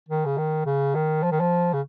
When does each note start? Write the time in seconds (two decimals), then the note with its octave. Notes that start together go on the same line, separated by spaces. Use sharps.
0.08 D#3
0.25 C#3
0.38 D#3
0.65 C#3
0.95 D#3
1.23 F3
1.31 D#3
1.40 F3
1.73 C#3